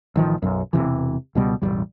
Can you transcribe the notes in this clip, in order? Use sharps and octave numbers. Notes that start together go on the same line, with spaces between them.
A1 D#3 F3
B1 F#2
E1 B1 C3 E3
C#2 B2 G3
E1 A1 F2 G3